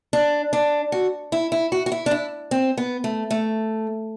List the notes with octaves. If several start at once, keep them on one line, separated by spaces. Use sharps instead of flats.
D4
D4
F#4
E4
E4
F#4
F#4
E4
D4
E4
C4
B3
A3
A3